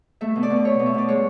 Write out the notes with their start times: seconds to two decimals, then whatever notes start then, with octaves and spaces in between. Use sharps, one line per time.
0.21 A3 E5
0.36 B2
0.43 D5
0.50 B2
0.65 A3 C#5
0.79 B2
0.86 E5
0.94 B2 D5
1.08 G#3 C#5